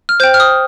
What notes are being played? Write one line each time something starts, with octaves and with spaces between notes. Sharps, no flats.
F6
C5 G5 G6
F6
D#6